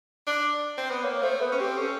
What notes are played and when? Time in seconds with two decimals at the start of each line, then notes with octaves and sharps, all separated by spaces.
0.27 D4
0.78 C4
0.91 B3
1.03 A#3 C#5
1.22 A3 C5
1.40 B3 B4
1.52 C#4
1.59 C4 G4
1.78 C#4 A4